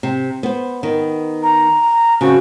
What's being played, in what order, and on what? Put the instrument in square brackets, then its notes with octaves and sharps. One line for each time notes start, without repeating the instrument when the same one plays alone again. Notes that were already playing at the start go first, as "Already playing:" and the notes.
[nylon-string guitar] C3
B3 C5
D#3 B3
[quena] A#5
[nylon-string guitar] C#3 C4 [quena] F#4